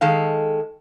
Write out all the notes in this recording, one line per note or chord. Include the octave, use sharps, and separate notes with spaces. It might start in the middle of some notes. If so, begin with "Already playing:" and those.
D#3 G#3 A4 F5